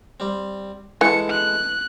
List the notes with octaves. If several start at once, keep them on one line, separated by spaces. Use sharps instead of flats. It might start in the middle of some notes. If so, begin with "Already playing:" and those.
G3 C4
E3 G#3 E4 A4 C#7
F#6